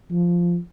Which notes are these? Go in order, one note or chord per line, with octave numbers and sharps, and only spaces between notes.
F3